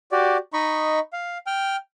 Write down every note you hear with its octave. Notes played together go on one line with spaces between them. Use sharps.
F#4 G4 D5
D#4 D#5 B5 C#6
F5
G5 F6